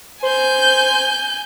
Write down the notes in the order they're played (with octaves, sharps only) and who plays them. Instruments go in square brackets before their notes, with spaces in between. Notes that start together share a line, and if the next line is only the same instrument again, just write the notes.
[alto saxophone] C5 [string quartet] G#5 G6